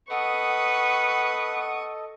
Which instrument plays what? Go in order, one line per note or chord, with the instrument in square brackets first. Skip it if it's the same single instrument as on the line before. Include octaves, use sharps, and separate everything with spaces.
[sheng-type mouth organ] A4 D#5 [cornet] B4 [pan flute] F#5 [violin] C#6 D#6